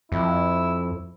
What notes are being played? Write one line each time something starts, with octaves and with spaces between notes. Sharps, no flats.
F2 E4